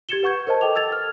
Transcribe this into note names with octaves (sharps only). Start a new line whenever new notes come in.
G4 G#6 A6 C#7 E7 G7
B4 F#5 C#6 G6 G#6
A#4 C5 D#5 A5
A4 B4 D#5 G5 D6 F7
E6 G#6 A6 F7
F6